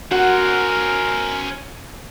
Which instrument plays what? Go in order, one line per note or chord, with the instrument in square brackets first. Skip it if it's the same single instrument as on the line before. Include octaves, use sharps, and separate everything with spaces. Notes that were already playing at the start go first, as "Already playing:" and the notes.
[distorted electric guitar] C#4 C5 [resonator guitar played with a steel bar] F#4 F#5 [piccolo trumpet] A#4